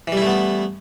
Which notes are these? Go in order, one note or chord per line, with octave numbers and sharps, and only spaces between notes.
E3 G3 A3 B3 E4